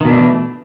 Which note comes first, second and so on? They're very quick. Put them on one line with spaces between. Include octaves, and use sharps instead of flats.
D#3 B2 D4 A3 E3